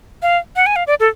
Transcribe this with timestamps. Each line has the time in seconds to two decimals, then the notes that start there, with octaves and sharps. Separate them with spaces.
0.22 F5
0.56 F#5
0.66 G#5
0.76 F5
0.87 D5
1.00 A4